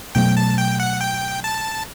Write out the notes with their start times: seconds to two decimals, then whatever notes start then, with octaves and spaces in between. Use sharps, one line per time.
0.15 B2 F#3 A3 G5
0.37 A5
0.58 G5
0.80 F#5
1.01 G5
1.44 A5